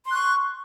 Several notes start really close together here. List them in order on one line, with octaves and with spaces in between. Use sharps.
C6 F#6 C#6